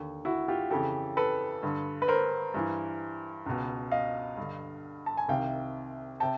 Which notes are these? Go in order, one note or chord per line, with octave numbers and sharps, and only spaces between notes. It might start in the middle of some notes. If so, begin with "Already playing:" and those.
Already playing: D#2 D3
E4 F#4
F4 G4
F2 C#3 E3 G4 A4
A4 B4
G2 D3
B4
A#4 C5
G2 E3
C#2 B2
D#5 F5
G2 D3
A5
G#5
C2 C3 D#3 F5 G5
C3 G5 A5